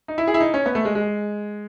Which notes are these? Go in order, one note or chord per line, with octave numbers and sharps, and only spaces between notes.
D#4
E4
G#4
E4
D#4
C#4
B3
A3
G#3
G#3